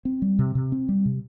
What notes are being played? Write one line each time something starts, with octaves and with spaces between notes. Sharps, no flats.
C4
G3
C3
C3
C4
G3
C3